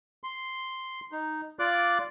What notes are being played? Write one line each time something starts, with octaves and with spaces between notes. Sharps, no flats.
C6
D#4
F4 D5 D6 F#6